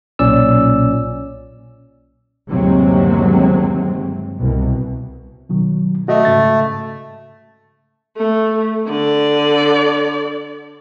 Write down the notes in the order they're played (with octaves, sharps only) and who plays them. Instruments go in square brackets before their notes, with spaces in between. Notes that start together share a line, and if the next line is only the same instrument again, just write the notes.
[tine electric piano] B1 A#2 C#4 D5 E6
[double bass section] G1 D#2 C3 F#3 G#3 C4
C2 B2
[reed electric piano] B2 D#3 F#3
[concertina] A3 [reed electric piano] F#4 D#5
[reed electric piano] G#2 C#3 A6
[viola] A3
D3 D5